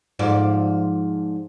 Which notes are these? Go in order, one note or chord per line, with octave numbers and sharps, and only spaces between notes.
G#2 F3 D5